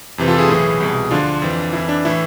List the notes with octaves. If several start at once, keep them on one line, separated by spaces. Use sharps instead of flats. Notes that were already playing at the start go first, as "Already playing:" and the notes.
F2 C3 E3
F4 A4
E4 G#4
B1 A2 E3
C2 B2
D2 D3 F3 D4 F4
F2 E3
F2 E3 E4
D4
A2 E3 E4